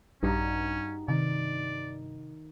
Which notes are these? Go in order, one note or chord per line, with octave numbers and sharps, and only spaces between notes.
A#1 G2 C#4 D#4 F#4 A#5
C3 D#3 D5